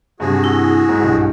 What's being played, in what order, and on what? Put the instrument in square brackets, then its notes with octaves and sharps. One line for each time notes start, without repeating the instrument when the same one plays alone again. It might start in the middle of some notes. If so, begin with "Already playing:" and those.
[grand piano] G2 C3 [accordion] F#4 G#4
[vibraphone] E4
[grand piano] G#2
B1 G2